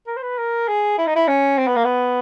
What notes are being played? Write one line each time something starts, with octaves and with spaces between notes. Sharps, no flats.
A#4
C5
B4
A#4
G#4
E4
D#4
E4
C#4
C4
B3
A#3
B3